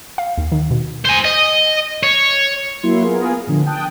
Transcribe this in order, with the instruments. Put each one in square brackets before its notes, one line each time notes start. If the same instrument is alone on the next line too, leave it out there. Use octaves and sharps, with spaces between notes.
[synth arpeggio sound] F5
D#2
D#3
B2
[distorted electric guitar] C5 G#5
D#5
C#5
[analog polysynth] F#3 A#3 E4 C6
B3 F4 G#4 A#4
A2 D3 F3
G5 A5 D#6 F#6